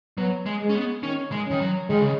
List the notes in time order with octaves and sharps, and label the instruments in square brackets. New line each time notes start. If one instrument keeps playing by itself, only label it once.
[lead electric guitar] F#3 [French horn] B3
[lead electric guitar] G#3
[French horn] G#3
[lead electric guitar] C#4
B3
[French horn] D#3 [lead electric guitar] C#4
[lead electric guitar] G#3
[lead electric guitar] D#3 [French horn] C#4
[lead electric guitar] F#3
[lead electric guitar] D#3 [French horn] G#3
[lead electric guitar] C#3